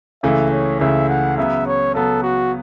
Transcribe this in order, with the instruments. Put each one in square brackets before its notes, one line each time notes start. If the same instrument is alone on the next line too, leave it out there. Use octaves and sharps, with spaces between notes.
[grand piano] C#2 C#3 E3 A3 [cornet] E5
[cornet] C#5
[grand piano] C#2 C#3 E3 A3 [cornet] E5
[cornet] F#5
[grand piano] C#3 F#3 B3 [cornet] E5
[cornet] C#5
[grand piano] C#3 F#3 B3 [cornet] A4
[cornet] F#4